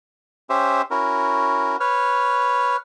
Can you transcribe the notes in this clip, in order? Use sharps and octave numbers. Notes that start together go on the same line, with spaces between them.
C#4 G4 C5 E5
C#4 E4 F#4 A#4
B4 C#5 F6